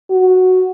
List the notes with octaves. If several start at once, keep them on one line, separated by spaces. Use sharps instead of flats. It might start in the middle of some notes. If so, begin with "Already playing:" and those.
F#4